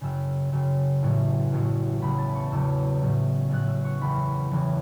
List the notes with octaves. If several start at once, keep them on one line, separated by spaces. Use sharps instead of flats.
F#1 F#2 C#3 F#3 E6
F#1 F#2 C#3 F#3
A1 A2 F#3
A1 A2 F#3
E1 E2 C#3 F#3 B5
A5
C#6
E1 E2 C#3 F#3 E6
A1 A2 F#3
A1 A2 F#3 F#6
E6
C#6
F#1 E2 C#3 E3 B5
F#1 E2 C#3 E3